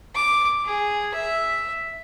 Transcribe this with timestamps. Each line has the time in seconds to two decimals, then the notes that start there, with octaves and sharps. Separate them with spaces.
0.15 D6
0.65 G#4
1.14 E5